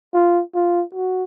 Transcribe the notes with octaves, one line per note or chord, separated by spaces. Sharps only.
F4
F4
F#4